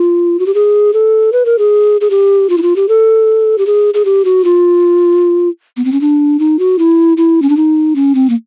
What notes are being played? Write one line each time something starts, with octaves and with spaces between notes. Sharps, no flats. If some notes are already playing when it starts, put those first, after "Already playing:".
Already playing: F4
F#4
G4
G#4
A4
B4
A#4
G#4
G#4
G4
F4
E4
F4
G4
A4
G4
G#4
G#4
G4
F#4
F4
B3
C4
C#4
D4
D#4
F#4
E4
E4
C#4
D4
D#4
C#4
C4
A#3